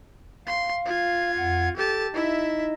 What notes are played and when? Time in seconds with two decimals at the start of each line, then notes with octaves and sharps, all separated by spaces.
0.47 F5 C6
0.86 F4 G#6
1.37 F2 F#5
1.77 G4 A4 A5
2.14 D#4 E4 D#5 E5